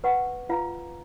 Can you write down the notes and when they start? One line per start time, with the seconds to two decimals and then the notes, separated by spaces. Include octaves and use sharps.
0.04 B4 F#5 C#6
0.49 F4 B4 F5 A#5